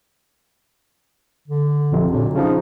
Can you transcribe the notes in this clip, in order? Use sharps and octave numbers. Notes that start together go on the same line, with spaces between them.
D3
A#1 F2 C3
A#2 D3 F#3
C#3 F3 D#4